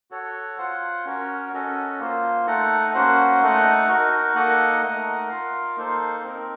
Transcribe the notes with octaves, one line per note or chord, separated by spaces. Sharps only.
F#4 A4 C#5
F4 C5 F#5
C#4 F#4 A#4 C#5
C#4 F#4 A4 D#5
A#3 F4 C5
A3 D#4 A4 D#5 F#5
A#3 C#4 F#4 C5 F#5
A3 D#4 A4 D#5 F#5
D#4 F#4 A#4
A#3 D#4 A4 D#5 F#5
A3 D#4 A#4 D#5 F#5
F4 A#4 F5
A#3 D#4 A4 C5
C4 D#4 A#4